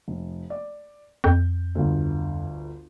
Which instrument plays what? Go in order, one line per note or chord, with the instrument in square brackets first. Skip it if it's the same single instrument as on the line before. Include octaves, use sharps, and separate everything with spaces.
[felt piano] F1
D5
[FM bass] F2 [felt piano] G6
[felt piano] G1 D2